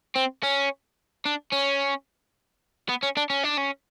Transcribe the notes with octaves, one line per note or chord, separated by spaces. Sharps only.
C4
C#4
D4
C#4
B3
C#4
D4
C#4
D4
C#4